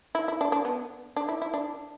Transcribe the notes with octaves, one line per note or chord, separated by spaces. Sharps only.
E4
E4
D4
D4
B3
D4
E4
E4
D4